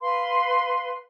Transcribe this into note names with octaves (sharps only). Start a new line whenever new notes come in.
B4 F5 C6